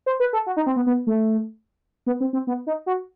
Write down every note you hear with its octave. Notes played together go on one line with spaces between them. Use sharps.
C5
B4
A4
F#4
D#4
C4
B3
B3
A3
B3
C4
C4
B3
D#4
F#4